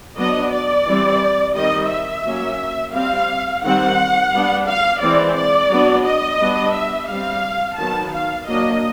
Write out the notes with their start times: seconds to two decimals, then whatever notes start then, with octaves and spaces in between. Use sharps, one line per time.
0.16 F#3 B3 D4 D#5
0.52 D5
0.86 E3 G3 C4
1.55 D#3 G3 C4 D#5
1.90 E5
2.24 F#3 A#3 C#4
2.93 G3 C4 F5
3.63 D#3 G3 C4 F#5
4.33 G3 B3 D4
4.67 F5
5.01 E3 G#3 C4 D5
5.35 D5
5.70 F#3 B3 D4
6.05 D#5
6.39 G3 B3 D4
6.74 E5
7.08 G3 C4 F5
7.78 D#3 F#3 B3 A5
8.13 F5
8.47 F#3 A#3 D4 D#5